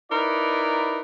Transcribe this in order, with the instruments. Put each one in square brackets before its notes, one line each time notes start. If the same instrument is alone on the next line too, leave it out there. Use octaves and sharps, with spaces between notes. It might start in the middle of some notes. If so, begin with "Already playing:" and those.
[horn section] D#4 E4 A#4 B4 D5